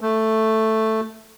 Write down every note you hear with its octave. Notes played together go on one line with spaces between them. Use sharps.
A3